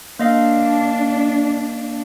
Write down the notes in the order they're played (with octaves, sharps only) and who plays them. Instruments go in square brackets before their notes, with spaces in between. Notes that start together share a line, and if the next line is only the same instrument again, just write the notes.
[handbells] A#3 D#5 F5 [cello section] D4